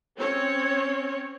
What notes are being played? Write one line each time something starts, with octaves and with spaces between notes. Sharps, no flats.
C4 C#4 C#5